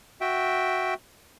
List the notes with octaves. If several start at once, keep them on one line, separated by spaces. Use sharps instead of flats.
F#4 E5 G5